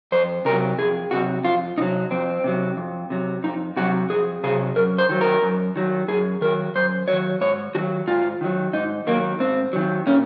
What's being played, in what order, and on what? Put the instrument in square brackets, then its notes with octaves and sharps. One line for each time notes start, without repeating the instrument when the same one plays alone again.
[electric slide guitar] F2 C5
C3 F#3 A#4
F2 G#4
C3 F#3 F#4
F2 F4
C3 D#4
F#3
F2 C4
C3 F#3
F2
C3 F#3
F2 D#4
C3 F#3 F#4
F2 G#4
C3 F#3 G#4
F#2 A#4
C5
D#3 F#3
A#4
F#2
D#3 F#3
F#2 G#4
D#3 F#3 A#4
F#2 C5
D#3 F#3 C#5
G#2 C#5
D#3 F#4
F#3
G#2 F4
D#3 F#3
G#2 D#4
D#3 F#3 A#3
G#2 C4
D#3 F#3
A#2 C#4